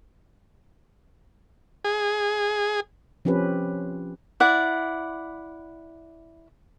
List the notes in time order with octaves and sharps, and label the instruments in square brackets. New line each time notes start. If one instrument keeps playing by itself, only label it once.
[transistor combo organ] G#4
[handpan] F3 C4 C#4 G4 B4
[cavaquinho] E4 D5 F#5